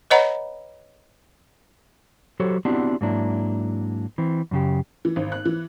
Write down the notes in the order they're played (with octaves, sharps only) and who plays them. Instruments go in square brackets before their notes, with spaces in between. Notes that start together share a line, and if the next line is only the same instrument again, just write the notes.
[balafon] B4 C#5 D#5 F#5 A#5 B5
[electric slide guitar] F#3 F#4 G4 A4 C5 C#5
B3 C4 D4 E4 F#4 G4
G#2 F#3 A#3 D4 E4
E3 C4
F#2 C#3 G4
[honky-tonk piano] E3
G#1
F#6
E3